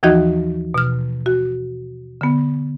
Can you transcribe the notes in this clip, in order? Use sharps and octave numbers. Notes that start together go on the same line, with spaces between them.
D#2 E3 F3 D#4 F#4 D#5
B2 F6
F#4
D3 B3